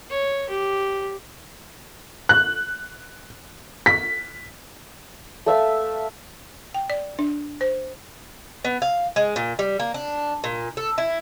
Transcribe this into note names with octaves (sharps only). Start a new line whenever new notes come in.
C#5
G4
F#6
B6
A3 E5 F5 E6
G5
D5
D4
C5
B3
F5
G#3
A#2
G3
A#3
D4
A#2
A4
E4